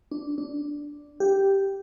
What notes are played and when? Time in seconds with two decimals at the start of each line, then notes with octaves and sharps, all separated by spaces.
0.11 D4
0.38 D4
1.20 G4